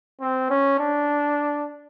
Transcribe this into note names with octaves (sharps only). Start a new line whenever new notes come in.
C4
C#4
D4